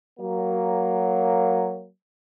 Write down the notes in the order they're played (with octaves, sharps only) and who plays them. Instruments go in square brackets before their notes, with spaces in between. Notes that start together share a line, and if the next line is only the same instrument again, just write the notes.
[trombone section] F#3 A#3